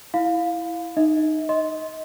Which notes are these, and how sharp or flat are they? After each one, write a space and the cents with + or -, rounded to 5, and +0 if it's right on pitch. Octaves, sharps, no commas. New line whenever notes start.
E4 +0 F5 +10 B5 +40
D#4 -10 D#5 +45
D#5 +25 C6 +0